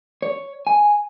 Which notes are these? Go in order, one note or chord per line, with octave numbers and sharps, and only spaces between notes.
C#5
G#5